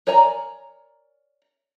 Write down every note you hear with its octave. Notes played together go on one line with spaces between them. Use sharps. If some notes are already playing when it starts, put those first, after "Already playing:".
A#4 C#5 D5 G#5 A#5